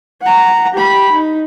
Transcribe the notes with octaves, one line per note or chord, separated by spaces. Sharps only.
F#5 A#5
G4 B5
D#4